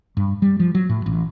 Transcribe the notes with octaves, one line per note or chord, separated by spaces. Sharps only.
G2
G3
F3
F#3
A2
A1